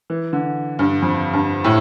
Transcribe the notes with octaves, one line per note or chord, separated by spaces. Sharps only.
E3
D3
G2
F2
G2
A2